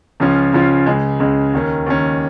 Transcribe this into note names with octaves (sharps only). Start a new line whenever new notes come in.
C#2 C#3 F3 C#4 F4
C#2 C#3 F3 C#4 F4
C#2 C#3 G#3
C#2 C#3 G#3
D#2 D#3 C#4
D#2 D#3 C#4